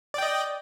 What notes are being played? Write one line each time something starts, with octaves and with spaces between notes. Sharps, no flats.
D5 D#5 G5